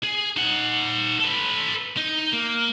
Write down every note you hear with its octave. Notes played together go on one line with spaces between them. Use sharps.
G#4
D#4 F#5
A4 B4
D#4
A#3